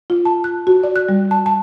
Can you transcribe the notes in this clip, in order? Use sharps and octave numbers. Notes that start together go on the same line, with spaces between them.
F4
A5
F#6
F#4
D5
F#6
G3
A5
A5